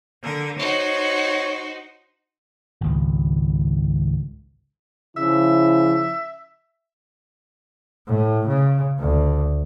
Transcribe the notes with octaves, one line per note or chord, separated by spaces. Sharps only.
D3 A#4
D#4 F#4 C5 C#5
G#1 C#2
C#3 F3 E4 E5
A2
C#3
D2